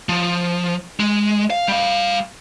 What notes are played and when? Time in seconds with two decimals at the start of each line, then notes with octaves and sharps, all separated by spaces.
0.09 F3
1.00 G#3
1.50 F5
1.68 G3 F5